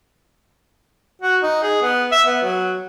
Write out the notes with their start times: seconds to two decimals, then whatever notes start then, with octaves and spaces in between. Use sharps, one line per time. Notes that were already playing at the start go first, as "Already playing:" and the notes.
1.22 F#4
1.43 D#4
1.63 G#4
1.82 B3
2.12 E5
2.27 B3
2.43 F#3